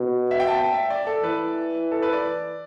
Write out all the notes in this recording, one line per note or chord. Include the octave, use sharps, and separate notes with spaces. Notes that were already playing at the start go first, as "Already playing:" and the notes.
Already playing: B2
E5
G5
A5
G5
E5
D5
A4
E3 B4
A4
B4
D5